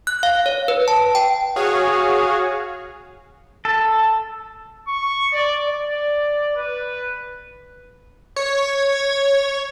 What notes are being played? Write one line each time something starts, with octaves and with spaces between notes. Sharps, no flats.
F#6
F5
C#5
B4
A5
G5
F#4 G#4 C#5 F5
A4
C#6
D5
D5
B4
C#5